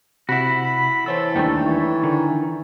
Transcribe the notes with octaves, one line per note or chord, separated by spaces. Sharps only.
C3 E4 F#4 F#5 B5
B5
E3 A4 C5 C#5 E6
D#2 D#3 G3 A3 D4 G5
E3 C#5
D3 D#3